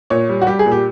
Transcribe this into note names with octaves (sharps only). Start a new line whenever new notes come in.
A#2 C#5
G3
F#4
G3 G4
G#4
A#2
G4